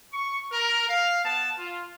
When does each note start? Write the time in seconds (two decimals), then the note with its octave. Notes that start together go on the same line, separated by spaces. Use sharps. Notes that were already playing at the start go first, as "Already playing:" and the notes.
0.12 C#6
0.51 A#4
0.89 F5
1.23 B3 A5
1.59 F4